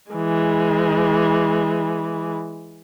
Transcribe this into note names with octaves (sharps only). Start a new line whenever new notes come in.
E3 G#3